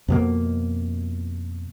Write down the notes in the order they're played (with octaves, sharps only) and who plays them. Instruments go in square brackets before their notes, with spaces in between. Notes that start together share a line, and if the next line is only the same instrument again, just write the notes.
[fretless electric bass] F2 B2 A#3